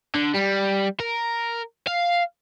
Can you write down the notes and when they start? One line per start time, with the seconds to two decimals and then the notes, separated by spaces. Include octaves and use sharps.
0.15 D3
0.35 G3
1.00 A#4
1.87 F5